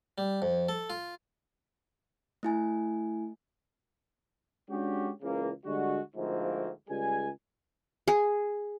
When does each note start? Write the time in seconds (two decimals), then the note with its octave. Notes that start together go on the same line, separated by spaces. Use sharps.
0.18 G3
0.42 F2
0.69 A4
0.90 F4
2.43 A3 E4 G#5
4.70 G#3 C#4 D4 F#4 G4
5.22 C#2 C#3 E3 A#3
5.65 D3 G3 G#3 F#4
6.16 D2 G#2 F3 A3 A#3 C4
6.89 C#2 G3 G#4 G#5
8.08 G#4